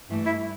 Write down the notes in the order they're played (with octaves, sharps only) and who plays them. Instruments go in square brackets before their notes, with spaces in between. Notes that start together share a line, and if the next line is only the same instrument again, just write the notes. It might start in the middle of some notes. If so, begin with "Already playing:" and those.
[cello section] G2 E3 A3
[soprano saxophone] E4